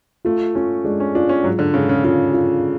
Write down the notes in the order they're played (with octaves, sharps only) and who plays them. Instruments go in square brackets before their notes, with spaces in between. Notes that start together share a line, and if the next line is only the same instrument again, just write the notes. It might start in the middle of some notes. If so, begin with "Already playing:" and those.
[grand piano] A3 [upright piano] F4
[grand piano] C#4 [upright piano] F4
[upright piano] G#3 [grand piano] D4
[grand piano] C#4
[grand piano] D4 [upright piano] F4
[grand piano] C#4
[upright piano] G#2 [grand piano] F#3
[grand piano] D3
[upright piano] G#2 [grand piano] C#3
[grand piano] C#3
[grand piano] C#3 [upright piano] F4
[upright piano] F4